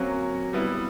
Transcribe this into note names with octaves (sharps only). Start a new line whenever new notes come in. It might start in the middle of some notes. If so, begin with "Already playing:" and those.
Already playing: F#3 A#3 C4 C#4 F#4
G3 B3 E4